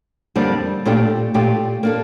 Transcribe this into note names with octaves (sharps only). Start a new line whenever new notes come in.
F2 D3 G3 A#3 D4
A#2 A3 D4 G4
A#2 A3 D4 G4
A#3 D4 A4